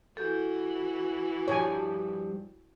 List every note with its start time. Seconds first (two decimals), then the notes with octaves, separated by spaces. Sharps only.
0.17 E3 F#4 A4 G6
1.48 G2 F3 C#5 G#5